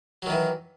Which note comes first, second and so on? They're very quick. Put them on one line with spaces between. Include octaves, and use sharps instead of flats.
F#3 D#3 E3